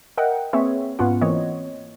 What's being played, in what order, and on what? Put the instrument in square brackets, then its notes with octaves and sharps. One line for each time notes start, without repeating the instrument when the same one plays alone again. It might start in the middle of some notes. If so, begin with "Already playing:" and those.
[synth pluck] A#4 D#5 E5 F#5 G5
A#3 C4 G#4 B4 C#5 E5
G#2 B3 C#4 F4 F#5
E3 A#3 C4 C#5 D#5